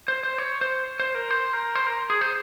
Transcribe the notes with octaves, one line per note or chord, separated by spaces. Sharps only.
C5
C5
C#5
C5
C5
A#4
C5
A#4
C5
A#4
G#4
C5